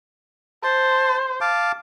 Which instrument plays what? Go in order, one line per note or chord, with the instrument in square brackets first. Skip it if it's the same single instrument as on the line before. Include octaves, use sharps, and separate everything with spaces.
[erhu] C5 [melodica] A5
[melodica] F5 A5 D6